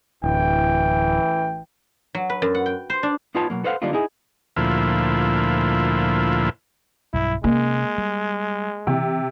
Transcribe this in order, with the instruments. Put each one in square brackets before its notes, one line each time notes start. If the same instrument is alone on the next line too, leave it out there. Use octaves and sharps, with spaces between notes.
[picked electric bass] D1 [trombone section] A1 E3 [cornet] G5
[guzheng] F#3
B4
F#2
F#5
G5
C5
D4
[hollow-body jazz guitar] B3 D#4 F4 B4 C#5 A5
B2 F#3 A#3
A4 B4 C5 F5 F#5
D3 F#3 G3 A#3 D#4 F4
D#4 E4 G#4
[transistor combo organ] D2 A#2 F3 E4
[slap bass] B1 G2 F#3 [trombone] E4
[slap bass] C3 C#4 [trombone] G#3 [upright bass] A#3
[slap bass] G3
[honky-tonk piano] C3 [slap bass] E3